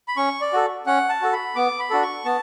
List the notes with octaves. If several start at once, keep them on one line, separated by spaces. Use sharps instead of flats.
B5
C#4 C#6
D5
F#4 A4
C#4 F#5
A5
F#4 A4
B5
B3 D6
B5
D4 F#4 A4
C#6
B3 A5